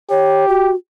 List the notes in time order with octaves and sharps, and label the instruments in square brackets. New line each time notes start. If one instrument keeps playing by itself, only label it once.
[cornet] G4 [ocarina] C#5
[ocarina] F#4